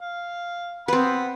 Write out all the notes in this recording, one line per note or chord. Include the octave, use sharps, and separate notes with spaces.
F5
C4 B4 F#5 B5